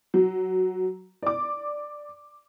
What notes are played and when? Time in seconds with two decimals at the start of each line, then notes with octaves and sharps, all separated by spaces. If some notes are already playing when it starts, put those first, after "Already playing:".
0.14 F#3
1.23 D5 D6